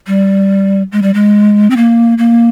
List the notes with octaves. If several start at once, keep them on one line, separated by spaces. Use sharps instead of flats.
G3
G#3
G3
G#3
C4
A#3
A#3